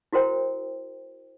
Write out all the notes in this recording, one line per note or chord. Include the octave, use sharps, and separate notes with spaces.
E4 F#4 A#4 C5 G5